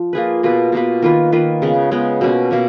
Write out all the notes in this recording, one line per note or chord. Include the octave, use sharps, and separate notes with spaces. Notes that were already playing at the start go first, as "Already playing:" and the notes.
Already playing: F3
A#3 F4 G#4 B4
B2 A#3 F4 B4
B2 A#3 F4 B4
D#3 A#3 F4 B4
D#3 A#3 F4 B4
C#3 G#3 B3
C#3 G#3 B3
B2 A#3 C#4
B2 A#3 C#4